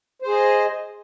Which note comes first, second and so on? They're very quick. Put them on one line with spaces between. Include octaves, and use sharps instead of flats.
C5 G#4 D#5